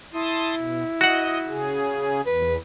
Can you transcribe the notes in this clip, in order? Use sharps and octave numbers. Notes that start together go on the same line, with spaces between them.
E4 A5 C6 D#6
B2
F#4 D#5 F#5
C#3 G#4
E2 B4